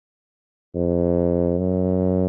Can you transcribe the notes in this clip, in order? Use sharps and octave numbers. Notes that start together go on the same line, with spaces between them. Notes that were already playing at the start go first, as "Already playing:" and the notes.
F2
F#2